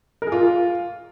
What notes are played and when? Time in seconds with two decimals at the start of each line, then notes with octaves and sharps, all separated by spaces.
0.22 A#4
0.27 G#4
0.32 F4